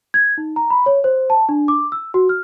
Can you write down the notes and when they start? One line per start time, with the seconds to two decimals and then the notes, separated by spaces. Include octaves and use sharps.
0.14 G#6
0.38 D#4
0.56 A#5
0.70 B5
0.86 C#5
1.04 C5
1.30 A5
1.49 D4
1.68 D6
1.92 E6
2.14 F#4
2.29 F6